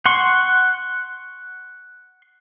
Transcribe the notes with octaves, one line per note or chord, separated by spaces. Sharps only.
F#5 C6 C#6